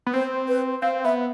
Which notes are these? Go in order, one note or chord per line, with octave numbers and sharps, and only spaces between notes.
B3
C4 C5
B4
C4 F5
B3 E5